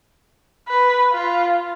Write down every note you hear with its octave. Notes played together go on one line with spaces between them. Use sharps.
B4
F4